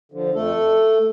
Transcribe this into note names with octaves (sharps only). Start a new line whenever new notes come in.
D3 F3
F2 A3 A4